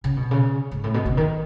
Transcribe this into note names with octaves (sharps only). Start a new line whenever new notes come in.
C#3
B2
C#3
G#2
A2
B2
C#3
D#3